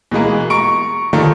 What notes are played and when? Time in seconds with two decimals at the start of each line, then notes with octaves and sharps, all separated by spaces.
0.11 B2 E3 G#3 A#3
0.50 A#5 C#6 D7
1.13 D3 D#3 F3 A3 A#3